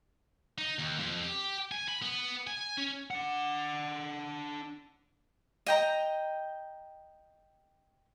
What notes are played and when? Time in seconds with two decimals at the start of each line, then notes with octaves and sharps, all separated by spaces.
0.58 D#4
0.79 D#2
1.00 F2
1.23 G4
1.71 G#5
1.88 B5
2.02 B3
2.47 G#5
2.78 C#4
3.11 D4 F#5
5.66 D#5 G5 A#5